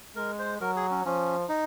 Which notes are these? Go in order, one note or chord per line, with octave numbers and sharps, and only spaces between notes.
G#3 A#4
C5
F#3 A#4
G#4
C#4
F3 C#4
D#4